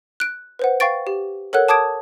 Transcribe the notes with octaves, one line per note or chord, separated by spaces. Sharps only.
F#6 D7
B4 C5 F#5
F5 G5 C#6 A6 D7
G4
A4 A#4 C#5 F#5 F#6
A5 D6 D#6 G#6 D7